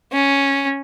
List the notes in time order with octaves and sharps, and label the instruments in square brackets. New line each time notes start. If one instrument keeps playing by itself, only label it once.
[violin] C#4